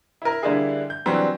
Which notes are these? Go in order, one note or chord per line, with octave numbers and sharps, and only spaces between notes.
E4 A#4
D3 G3 A#3 D4 E4 G#4
G6
E3 F#3 G3 C4 D4